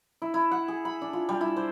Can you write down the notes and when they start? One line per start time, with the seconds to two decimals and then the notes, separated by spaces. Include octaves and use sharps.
0.22 E4
0.34 E4
0.51 F#5
0.68 G#4
0.85 B5
1.02 D4
1.13 F4
1.29 G3
1.41 E4
1.57 C5